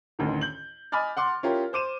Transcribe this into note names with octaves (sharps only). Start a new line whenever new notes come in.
A1 D2 D#3
G6 F#7
D#5 G#5 B5 D6 F6 A6
F#5 C6 D6
C#4 E4 F4 G4 A#4
C5 D6 D#7 E7